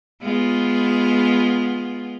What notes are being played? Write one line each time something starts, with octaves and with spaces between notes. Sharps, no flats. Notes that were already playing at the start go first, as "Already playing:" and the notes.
G#3 B3 F4